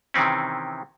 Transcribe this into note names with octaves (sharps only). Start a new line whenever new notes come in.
C3 D#3 E3 C4 C#4